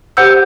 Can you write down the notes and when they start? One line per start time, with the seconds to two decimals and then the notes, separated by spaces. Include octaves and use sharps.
0.17 G4 C5 F#5 E6 G6